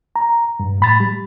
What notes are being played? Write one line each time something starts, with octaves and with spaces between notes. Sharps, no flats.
A#5
G2
A2 B5 A6
G3